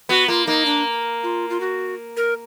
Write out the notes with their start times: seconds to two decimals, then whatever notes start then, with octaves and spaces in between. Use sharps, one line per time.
0.09 B3 F#4
0.28 A#3 F4
0.46 A#3 D#4
0.66 D4
1.23 F4
1.50 F4
1.60 F#4
2.17 A#4